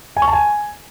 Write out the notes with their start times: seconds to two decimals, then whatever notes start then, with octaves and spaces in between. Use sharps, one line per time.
0.17 G#5
0.22 C#6
0.27 A5
0.33 G#5